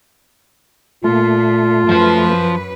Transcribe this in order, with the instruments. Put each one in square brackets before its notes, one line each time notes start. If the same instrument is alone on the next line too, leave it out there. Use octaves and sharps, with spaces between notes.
[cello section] A#2 [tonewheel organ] A3 [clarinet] F4
[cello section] F#2 B4 [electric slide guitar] F3 C5